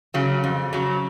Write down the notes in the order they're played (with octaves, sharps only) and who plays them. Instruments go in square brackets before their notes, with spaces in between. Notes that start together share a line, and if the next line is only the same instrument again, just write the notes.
[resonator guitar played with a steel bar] C#3 F#3
F2
C#3 F#3